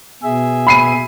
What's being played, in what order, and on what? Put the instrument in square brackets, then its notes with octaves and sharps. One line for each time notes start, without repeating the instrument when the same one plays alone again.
[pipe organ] B2 G#4 E5
[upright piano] B5 C7 D#7